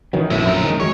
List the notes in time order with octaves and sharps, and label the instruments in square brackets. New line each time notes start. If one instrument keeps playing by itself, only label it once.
[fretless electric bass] D#3 E3 F#3
[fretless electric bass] A#1 F#2 A2 [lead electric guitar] C4 E4
[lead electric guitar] C4 A#4
[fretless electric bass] D#3 G#3
[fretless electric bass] F2 F#3 G#3 [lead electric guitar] C#5